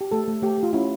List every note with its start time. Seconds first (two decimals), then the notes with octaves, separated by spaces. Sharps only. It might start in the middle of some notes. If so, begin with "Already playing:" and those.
0.01 G4
0.11 A3 A4
0.28 A3
0.43 A3 G4
0.58 A3
0.63 F4
0.73 C#4 E4